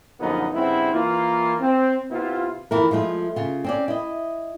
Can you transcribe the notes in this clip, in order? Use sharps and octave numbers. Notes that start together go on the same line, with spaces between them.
A#1 F#2 D3 F3 B3 D#4
G2 C#3 B3 C4 E4
E3 A#3 F4
C4
C3 B3 E4 F4
F2 E3 E4 A#4
F3 G#3 A3 F4
C#3 F4
C4 C#4 D5
E4 D#5